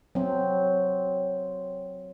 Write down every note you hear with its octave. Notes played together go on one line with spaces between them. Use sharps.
F#3 C4